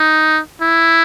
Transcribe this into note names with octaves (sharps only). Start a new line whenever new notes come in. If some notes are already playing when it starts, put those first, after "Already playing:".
Already playing: D#4
E4